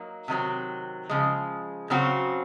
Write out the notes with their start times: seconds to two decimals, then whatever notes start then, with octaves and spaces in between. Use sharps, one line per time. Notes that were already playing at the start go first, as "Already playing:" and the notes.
Already playing: F#3 A#3 D#4
0.28 C3 D#3 F#3 C4
1.09 C#3 F3 G#3
1.90 C#3 F#3 C4 F#4